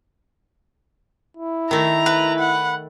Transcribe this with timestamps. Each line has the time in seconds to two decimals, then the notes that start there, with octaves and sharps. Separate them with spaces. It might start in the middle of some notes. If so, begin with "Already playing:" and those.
1.37 E4
1.71 D#3 A3 A#5
2.06 B4
2.39 F#5